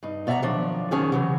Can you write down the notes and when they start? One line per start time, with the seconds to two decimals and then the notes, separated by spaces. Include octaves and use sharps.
0.03 G2 D#4
0.27 B2 D5 E5 F#5 A#5
0.42 D#3 F3 F#3 D4
0.91 F2 D#3 F#3 C#4 G#4 A5
1.12 C#3 E3 F#3